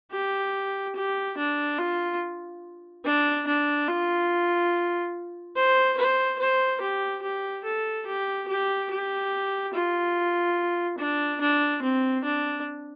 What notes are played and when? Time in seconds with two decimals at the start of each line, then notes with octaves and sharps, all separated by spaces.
0.12 G4
0.96 G4
1.37 D4
1.79 F4
3.05 D4
3.47 D4
3.88 F4
5.55 C5
5.97 C5
6.39 C5
6.81 G4
7.23 G4
7.65 A4
8.06 G4
8.48 G4
8.90 G4
9.74 F4
10.98 D4
11.41 D4
11.82 C4
12.24 D4